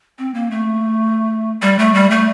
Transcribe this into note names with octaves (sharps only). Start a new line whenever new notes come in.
C4
A#3
A3
G3
A3
G3
A3